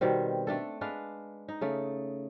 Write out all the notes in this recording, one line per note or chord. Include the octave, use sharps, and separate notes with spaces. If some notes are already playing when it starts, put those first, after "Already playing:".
B2 D#3 G3 C4
A3 D4 A4
G#3 D4 B4 F5
D#4
C#3 A3